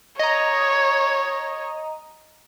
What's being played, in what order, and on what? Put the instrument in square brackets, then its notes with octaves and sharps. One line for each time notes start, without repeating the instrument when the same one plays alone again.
[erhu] C#5 [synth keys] D#5 A#5